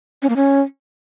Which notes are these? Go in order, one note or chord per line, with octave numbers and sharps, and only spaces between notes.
C#4
A#3
C#4